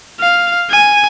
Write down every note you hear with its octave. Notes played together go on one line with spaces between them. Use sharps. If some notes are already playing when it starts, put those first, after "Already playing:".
F5
G#5